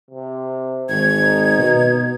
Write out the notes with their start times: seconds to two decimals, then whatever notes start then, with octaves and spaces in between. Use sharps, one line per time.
0.11 C3
0.89 G#1 G#6
1.21 D#4
1.58 B2